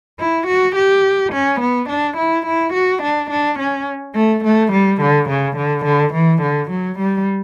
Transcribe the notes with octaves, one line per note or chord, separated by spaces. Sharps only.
E4
F#4
G4
C#4
B3
D4
E4
E4
F#4
D4
D4
C#4
A3
A3
G3
D3
C#3
D3
D3
E3
D3
F#3
G3